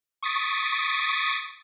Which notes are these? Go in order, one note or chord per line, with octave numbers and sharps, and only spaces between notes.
C#6 D#6 A6 B6 D7